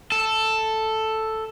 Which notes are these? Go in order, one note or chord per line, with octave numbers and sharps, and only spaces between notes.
A4